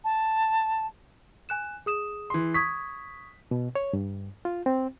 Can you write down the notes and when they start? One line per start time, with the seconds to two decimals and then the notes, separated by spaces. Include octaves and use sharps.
0.04 A5
1.49 G#5 F#6 E7
1.86 G#4 D#6 E7
2.30 E3 C6
2.54 C#6 D#6 G#6 B6
3.51 B2
3.75 C#5
3.93 G2
4.45 F4
4.66 C4